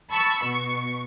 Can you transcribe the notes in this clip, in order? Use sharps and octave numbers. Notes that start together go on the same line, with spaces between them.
A5 B5 C#6 E6
B2 C#6